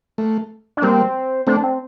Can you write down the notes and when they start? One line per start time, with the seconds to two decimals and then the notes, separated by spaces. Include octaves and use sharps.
0.18 A3
0.77 D4
0.82 G3 A#3 C4
1.47 A3 C4 D4
1.64 C4